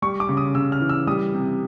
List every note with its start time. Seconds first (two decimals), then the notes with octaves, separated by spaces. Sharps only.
0.02 G3 C#6
0.20 D6
0.29 C#3
0.37 D#6
0.55 C#3 E6
0.72 F6
0.81 E3
0.89 E6
1.07 G3 D#6
1.34 C3